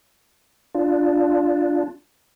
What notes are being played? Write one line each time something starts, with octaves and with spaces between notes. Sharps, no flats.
D4 F4